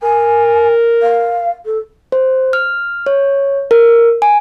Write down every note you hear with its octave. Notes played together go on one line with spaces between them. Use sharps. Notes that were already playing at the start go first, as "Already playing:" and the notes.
A#4 G#5
F5
A4
C5
F6
C#5
A#4
G#5